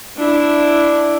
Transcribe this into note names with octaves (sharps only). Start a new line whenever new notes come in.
D4 E4